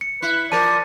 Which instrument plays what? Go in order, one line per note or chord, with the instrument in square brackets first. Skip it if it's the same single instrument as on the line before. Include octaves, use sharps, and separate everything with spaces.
[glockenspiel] C#7
[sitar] E4 [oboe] B4
[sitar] F3 A#4 [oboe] D5 [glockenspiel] A5 D#7